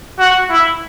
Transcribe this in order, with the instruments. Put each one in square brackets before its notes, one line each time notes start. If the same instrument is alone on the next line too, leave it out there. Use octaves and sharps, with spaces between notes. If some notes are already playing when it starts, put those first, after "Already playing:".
[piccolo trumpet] F#4
E4